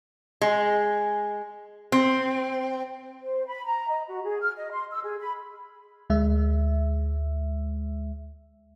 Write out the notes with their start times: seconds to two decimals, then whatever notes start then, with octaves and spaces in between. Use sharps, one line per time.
0.41 G#3
1.92 C4
3.22 C5
3.47 B5
3.65 A#5
3.89 D#5
4.08 F#4
4.24 G#4
4.41 F6
4.57 D#5
4.71 C6
4.91 E6
5.04 G#4
5.19 B5
6.10 D2 G#3 E5